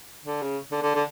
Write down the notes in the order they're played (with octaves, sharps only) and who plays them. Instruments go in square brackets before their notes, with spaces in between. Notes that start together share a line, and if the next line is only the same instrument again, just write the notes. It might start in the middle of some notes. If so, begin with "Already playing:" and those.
[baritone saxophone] D3
C#3
D3
D3
D3